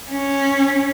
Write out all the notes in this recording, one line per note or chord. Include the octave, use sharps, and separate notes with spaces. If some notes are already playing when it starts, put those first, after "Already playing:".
C#4